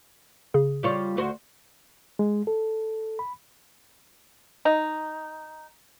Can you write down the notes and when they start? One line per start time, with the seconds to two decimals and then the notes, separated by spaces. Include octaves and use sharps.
0.54 C#3 G#4
0.83 G3 F4 C#5
1.17 D2 F#4 C5
2.19 G#3
2.47 A4
3.19 B5
4.65 D#4